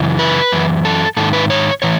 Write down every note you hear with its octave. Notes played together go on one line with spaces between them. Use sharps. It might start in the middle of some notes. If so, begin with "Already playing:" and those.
Already playing: F#2 C#3 E3
B4
F#2 E3
A4
G#2 D#3 A4
B4
C#5
A2 E3 C#5